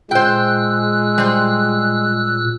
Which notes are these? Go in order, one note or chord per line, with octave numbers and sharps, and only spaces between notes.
A#2 G#3 C5 G5 E6 F#6
G3 C5